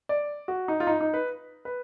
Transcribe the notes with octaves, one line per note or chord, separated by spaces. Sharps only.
D5
F#4
D#4
F4
D#4
D#4
B4
B4